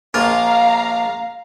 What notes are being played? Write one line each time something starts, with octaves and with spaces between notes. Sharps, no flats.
A#1 F4 A#4 F5 A#5